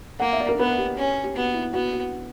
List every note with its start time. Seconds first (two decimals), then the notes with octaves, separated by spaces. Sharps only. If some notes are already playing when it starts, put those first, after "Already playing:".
0.20 A#3 F#5
0.33 E5
0.40 D5
0.49 A#4
0.59 B3 B4
0.78 G4
0.97 C#4
1.24 G4
1.35 B3 F#4
1.54 E4
1.73 B3 F#4
1.93 F#4